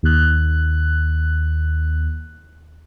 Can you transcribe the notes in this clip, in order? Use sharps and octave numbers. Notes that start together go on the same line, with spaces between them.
D#2 F#6